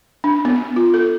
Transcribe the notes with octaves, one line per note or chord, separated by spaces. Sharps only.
D4
B3
F4
A4